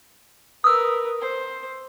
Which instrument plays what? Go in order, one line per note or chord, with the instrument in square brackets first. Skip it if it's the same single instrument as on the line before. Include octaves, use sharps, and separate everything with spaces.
[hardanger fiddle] A#4 B4 [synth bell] D#6 E6
[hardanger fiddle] C5